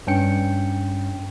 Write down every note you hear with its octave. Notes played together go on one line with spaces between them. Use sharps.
G2 C#4 G5 C#7